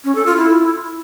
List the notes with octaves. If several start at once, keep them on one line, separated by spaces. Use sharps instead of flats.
C#4
A4
F4
E4